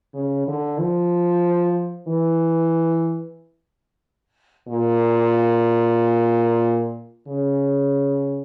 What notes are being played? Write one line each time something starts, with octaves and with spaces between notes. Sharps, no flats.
C#3
D3
F3
E3
A#2
C#3